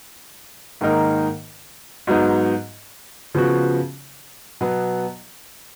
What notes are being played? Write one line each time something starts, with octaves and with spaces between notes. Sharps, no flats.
G#2 D#3 A#3 D#4 A#4
G#2 F#3 B3 D#4
C#3 F3 B3 F#4
B2 F#3 B3